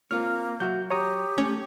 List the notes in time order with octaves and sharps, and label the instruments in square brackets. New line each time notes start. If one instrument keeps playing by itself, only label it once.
[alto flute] A#3 [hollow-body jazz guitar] C4 F4 C#5 [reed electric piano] F6
[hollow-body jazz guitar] F#3 E5 [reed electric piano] F#4 G6
[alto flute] G4 [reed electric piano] C#5 A#5 D#6
[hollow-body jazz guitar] A3 [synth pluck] C#4